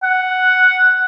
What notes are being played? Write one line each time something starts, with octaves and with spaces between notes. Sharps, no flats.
F#5